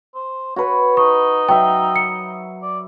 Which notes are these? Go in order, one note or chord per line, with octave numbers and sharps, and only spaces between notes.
C5
F#4 B4 C#5
D#4 C#6
F#3 E5 G5
C#7
D5